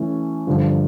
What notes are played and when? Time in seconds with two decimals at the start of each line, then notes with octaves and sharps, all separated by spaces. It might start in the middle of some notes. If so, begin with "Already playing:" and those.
Already playing: E3 A3 C#4
0.47 G2 D3 F3